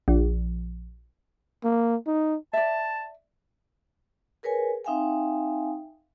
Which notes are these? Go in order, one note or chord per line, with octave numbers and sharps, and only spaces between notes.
A#1
A#3
D#4
D5 E5 A5
G#4 A#4 B4 C#5 G#5
C4 D#4 E5 F5 G5 G#5